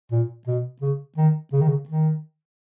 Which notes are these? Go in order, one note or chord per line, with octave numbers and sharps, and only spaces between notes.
A#2
B2
C#3
D#3
C#3
D#3
C#3
D#3